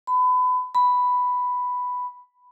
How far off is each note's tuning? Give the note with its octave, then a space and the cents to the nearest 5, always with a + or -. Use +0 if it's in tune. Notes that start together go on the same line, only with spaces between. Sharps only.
B5 +30
B5 +5